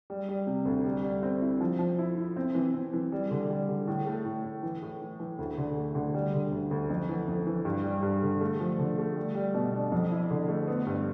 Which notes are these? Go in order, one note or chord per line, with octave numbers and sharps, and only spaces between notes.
G3
G3
C3
D2
G3
G3
C4
E4
F3
F3
E4
E4
C4
E3
C4
E3
G3
D3
G3
D3
A2
A3
A2
A2
E3
A2
E3
E3
D2
D3
A3
D3
G3
D3
D2
D2
F2
E3
F2
E3
G2
G3
G2
D3
A3
F3
D3
A3
G3
G3
B2
D4
F2
E4
D3
A3
B3
G2